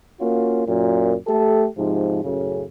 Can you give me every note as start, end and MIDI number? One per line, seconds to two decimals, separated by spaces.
0.21 0.63 58
0.21 0.63 61
0.21 0.63 65
0.21 0.63 66
0.68 1.14 42
0.68 1.14 46
1.28 1.66 57
1.28 1.66 67
1.28 1.66 69
1.78 2.23 44
1.78 2.23 48
1.78 2.23 53
2.24 2.64 42
2.24 2.64 45
2.24 2.64 49